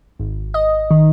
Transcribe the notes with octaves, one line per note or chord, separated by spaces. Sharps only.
G#1
D#5
D#3